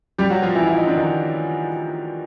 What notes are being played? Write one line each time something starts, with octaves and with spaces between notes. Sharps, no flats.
G3 G4
F#3 F#4
F3 F4
E3 E4
E4
D#4
D4
D#3 D#4